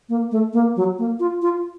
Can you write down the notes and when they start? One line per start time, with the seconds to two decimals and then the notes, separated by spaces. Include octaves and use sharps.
0.09 A#3
0.31 A3
0.53 A#3
0.76 F#3
0.98 A#3
1.20 F4
1.42 F4